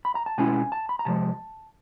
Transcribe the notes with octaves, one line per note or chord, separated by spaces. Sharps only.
B5
A#5
A5
B2 G#3 C#4 E4 G#5
A5
B5
A#5
C3 F3 G#3 A5